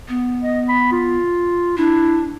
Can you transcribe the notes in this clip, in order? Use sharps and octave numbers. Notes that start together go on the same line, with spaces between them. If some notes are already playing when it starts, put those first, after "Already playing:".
B3
D#5
B5
F4
D4 E4